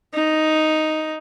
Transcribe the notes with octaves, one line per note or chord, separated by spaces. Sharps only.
D#4